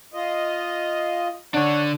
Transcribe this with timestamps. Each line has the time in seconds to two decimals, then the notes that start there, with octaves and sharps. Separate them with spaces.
0.14 F4 D#5
1.55 D3 D4 C#5 F#5